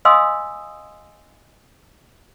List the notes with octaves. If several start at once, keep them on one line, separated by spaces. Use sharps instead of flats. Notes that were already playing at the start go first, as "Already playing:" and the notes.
D#5 F5 G#5 C6 D#6 E6